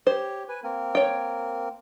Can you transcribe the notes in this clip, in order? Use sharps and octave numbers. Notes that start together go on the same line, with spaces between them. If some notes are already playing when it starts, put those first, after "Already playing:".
G4 C5 C#5
B4 G#5
A#3 C4 A#4
C#5 G5